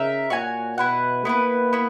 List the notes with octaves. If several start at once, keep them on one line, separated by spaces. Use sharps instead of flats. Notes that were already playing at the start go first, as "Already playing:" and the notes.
Already playing: C#3 D#4 A#4 E5
A#2 F#4 C#5 G#5
B2 E4 B4 F#5
A#3 B3 E4 B4
B3 E4